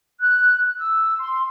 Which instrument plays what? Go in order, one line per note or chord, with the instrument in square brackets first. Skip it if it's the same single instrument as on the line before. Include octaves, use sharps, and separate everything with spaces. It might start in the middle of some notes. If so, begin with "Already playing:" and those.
[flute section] F#6
E6
C6